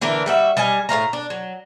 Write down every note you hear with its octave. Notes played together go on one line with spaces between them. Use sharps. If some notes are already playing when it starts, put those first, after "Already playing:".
D3 E3 D4 A#4
G3 F#4 E5
G3 D#5 F5 G#5
A2 C#4 F5 A#5
D4
F#3